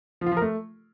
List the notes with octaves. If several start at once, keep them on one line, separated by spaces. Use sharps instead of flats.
F3
F4
F3
A#4
A3